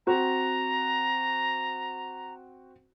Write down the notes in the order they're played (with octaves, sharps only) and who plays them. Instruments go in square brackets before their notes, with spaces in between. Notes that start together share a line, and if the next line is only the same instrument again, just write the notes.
[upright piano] C4 F#4 [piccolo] A#5